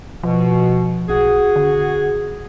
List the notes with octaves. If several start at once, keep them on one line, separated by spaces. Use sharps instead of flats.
B2 F3
B1 F#4 G#4
D3